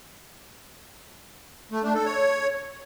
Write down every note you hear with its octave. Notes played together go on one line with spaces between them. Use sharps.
A3
D4
A4
C#5